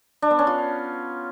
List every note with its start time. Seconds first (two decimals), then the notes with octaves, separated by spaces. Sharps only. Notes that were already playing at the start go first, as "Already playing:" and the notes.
0.22 D4
0.31 B3
0.39 C#4
0.47 F4